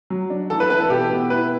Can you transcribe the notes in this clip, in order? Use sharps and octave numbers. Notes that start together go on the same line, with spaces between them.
F#3
D4
E3 A4
B4
E4 B4
A4
B2 G4
B3
E4 B4